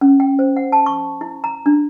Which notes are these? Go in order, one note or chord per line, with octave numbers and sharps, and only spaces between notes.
C#4
G5
C5
F#5
A5
C#6
E4
A#5
D4